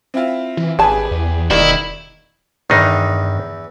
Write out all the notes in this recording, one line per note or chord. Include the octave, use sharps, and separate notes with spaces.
C4 E4 F4
E3
G#1 C#3 G4 G#4 B4 A5
E2
E1 D#3 G3 A#3 D#4 E4
E2 G2 D#3 E3 D4 D#4